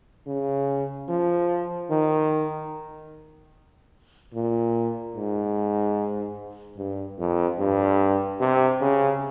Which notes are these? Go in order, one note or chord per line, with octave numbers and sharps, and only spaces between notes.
C#3
F3
D#3
A#2
G#2
G2
F2
G2
C3
C#3